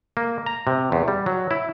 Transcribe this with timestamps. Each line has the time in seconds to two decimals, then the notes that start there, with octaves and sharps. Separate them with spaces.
0.17 A#3
0.46 A#5
0.67 C3
0.92 E2
1.08 G3
1.26 F#3
1.51 E4